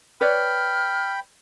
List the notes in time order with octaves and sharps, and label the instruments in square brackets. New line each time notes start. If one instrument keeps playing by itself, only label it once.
[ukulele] B4 C#5 D5 [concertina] G5 B5 [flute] F6